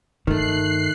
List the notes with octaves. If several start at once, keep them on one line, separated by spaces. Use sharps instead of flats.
G2 D#3 A3 D#4 F#6 C7